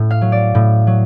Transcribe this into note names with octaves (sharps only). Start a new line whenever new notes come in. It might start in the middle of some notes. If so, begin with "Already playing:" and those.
Already playing: A2
F5
F#3
D5
A2
F#3